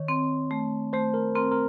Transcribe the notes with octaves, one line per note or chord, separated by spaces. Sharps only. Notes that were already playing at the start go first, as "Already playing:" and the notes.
Already playing: D#3 C#5
C4
A3
A3 C5
A#4
C4 A#4
A#4